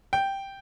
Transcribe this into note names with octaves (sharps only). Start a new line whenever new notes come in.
G5